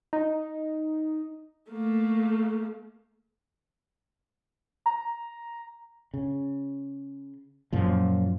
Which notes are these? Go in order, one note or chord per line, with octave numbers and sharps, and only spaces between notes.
D#4
A3 A#3
A#5
C#3
F#2 A#2 F3